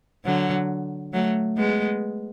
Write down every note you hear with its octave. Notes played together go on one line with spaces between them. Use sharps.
D3 F#3
F#3 A3
G#3 B3